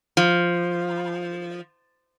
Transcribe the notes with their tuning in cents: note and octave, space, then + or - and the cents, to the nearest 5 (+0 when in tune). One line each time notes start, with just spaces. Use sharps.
F3 +0